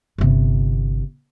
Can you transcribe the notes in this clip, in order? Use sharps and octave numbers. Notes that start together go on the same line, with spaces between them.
G1 C3